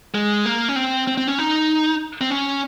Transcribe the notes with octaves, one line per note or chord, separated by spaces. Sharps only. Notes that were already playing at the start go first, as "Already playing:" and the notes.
G#3
A#3
C#4
C4
C4
C4
C#4
D#4
C4
C#4